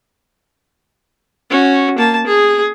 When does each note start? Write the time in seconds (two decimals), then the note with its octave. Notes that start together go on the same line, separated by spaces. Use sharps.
1.50 C#4 F#4
1.98 A#3 A5
2.27 G#4